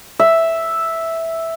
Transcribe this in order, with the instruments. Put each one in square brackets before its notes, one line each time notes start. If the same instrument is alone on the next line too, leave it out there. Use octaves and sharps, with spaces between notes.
[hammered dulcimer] E5